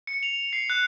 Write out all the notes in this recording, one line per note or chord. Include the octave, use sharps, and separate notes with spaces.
C#7
F7
C7
F#6